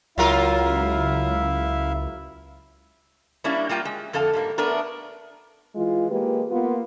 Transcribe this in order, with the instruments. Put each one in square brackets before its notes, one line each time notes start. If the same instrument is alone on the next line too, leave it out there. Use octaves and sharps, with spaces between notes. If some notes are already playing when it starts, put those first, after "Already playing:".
[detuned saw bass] C#2 [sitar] F#3 F4 A#4 [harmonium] E4 E5 F5
[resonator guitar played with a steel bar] G3 A#3 C#4 D4 E4
G3 A#3 F4 G5
G#3
F2 D3 A4 F5 A5
G#2 G3 A#3
A3 B3 D4 A4 A#4
[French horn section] E3 G#3 F4
G#3 A#3 G4 B4
A#3 B3 F4